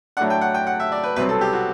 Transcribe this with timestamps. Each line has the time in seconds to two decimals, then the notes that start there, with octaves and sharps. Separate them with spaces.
0.17 A2 F#3 A3 D4 F#5
0.30 G5
0.41 F#5
0.54 G5
0.67 F#5
0.80 E5
0.92 D5
1.03 B4
1.16 C2 B2 F#3 C4 B4
1.29 A4
1.41 G4
1.53 F#4